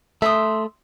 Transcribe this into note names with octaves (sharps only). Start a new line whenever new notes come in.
A3 E5 C6 D#6